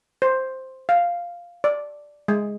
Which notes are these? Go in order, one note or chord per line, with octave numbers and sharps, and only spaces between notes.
C5
F5
D5
G#3